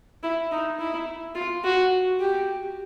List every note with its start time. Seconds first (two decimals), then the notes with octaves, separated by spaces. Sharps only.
0.23 E4
0.52 D#4
0.79 E4
1.35 F4
1.64 F#4
2.20 G4